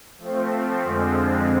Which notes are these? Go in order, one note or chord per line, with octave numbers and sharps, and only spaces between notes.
F3 A3 C4
F2 D3 F3 G#3 C4